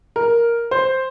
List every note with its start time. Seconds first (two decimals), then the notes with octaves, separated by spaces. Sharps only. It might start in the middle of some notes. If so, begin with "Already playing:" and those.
0.16 A#4
0.71 C5